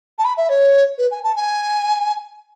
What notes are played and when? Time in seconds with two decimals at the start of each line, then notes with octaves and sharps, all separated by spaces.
0.18 A5
0.24 B5
0.37 E5
0.49 C#5
0.98 B4
1.11 G#5
1.23 A5
1.36 G#5